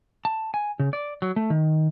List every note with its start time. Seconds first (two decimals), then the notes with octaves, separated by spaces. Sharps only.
0.25 A5
0.54 G#5
0.79 C#3
0.93 D5
1.22 F#3
1.36 A3
1.50 D#3